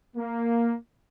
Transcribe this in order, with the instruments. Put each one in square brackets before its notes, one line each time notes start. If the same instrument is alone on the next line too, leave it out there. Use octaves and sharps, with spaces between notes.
[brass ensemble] A#3